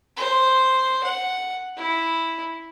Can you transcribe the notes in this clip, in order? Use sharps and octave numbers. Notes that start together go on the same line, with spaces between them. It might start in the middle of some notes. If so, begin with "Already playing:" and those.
C5
F#5
E4